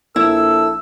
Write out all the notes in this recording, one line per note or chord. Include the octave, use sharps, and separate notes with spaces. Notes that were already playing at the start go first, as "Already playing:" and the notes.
A#1 E4 A4 E6